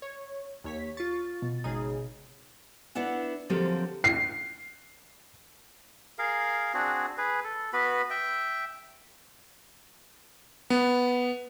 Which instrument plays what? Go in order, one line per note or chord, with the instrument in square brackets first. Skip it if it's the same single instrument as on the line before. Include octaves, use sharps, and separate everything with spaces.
[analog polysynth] C#5
D#2 C#5 B6
[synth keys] F4 C#6 [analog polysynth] A6
[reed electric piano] B2
[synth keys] G#1 C#3 D#6 [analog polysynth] D#4 G#4
[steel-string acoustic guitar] B3 D4 E4 F#5
D3 F3 F#3 A#3 C4 G4
[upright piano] C7
[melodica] G#4 A#4 F5
C4 D4 F#4 G#4
G#4 B4
A4
B3 F#4 B4 B5
E5 G5
[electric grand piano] B3